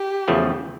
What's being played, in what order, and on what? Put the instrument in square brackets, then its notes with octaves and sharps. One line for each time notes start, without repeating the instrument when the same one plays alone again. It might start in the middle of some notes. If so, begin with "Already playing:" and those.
Already playing: [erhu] G4
[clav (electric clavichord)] E2 C#3 F3 A3